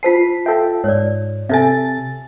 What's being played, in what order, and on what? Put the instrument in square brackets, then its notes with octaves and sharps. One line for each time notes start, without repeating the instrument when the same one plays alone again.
[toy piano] F4 C5 A5 [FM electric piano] B6 C7
[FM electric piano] F4 A4 G5 [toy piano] E5
[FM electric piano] G#2 [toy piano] C#5 D5
[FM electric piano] C3 A4 A6 [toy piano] E5 G#5